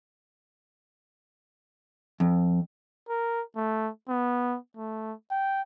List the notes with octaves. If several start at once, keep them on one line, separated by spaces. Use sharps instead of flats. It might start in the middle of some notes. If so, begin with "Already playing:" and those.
F2
A#4
A3
B3
A3
G5